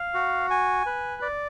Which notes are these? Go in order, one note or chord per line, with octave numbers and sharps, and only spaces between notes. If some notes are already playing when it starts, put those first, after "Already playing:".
Already playing: F5
F#4
G#5
B4
D5